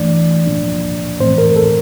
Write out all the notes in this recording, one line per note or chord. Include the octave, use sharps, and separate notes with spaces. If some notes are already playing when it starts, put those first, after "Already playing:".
Already playing: E3 A3 D4 D5
A#2 F3 A#3 D4
A2 E3 A3 C4 C5
A#4
A4